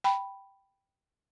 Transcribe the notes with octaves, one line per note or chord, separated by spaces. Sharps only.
G5 B5